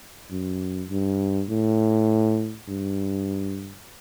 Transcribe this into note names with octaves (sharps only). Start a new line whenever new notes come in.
F#2
G2
A2
G2